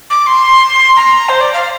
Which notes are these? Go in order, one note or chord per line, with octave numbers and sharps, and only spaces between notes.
D6
C6
A#5
C5
D5
F5